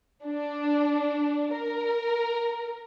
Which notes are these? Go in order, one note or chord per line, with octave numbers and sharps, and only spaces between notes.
D4
A#4